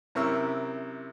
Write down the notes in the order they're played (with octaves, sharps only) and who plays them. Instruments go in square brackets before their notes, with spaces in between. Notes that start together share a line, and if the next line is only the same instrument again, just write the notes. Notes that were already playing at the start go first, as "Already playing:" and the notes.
[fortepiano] F#2 C3 E4 A#4 C#6 E6